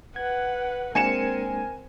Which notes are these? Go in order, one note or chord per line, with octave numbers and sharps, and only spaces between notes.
B4 F#5 G#6
G#3 A#3 C4 D4 A#4 G#5 C#7 E7